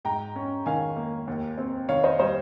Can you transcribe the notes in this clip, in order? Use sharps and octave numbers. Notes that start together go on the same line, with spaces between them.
G#2 G5 A#5
C#4
D#3 F5 G#5
A#3
D#2
C4
D#3 C#5 F5
C5 D#5
G3 C5 D#5